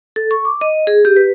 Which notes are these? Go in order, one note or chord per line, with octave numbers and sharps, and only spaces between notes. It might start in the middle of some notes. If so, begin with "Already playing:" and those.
A4
C#6
D6
D#5
G#4
G4
B4